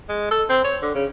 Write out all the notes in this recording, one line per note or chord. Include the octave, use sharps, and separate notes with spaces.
G#3
A4
C4
C#5
D3
C#3